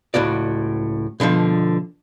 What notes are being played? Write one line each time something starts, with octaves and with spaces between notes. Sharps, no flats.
C#2 A2 F#4 D5
B2 D3 E3 F3